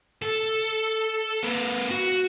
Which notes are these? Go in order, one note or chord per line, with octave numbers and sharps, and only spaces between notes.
A4
A#3 B4
F#4